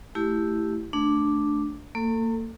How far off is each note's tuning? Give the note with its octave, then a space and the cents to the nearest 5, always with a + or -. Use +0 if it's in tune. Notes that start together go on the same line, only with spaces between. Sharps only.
A3 +0 E4 +0 G4 +0
A3 +0 D4 +0
A#3 -35 A4 +20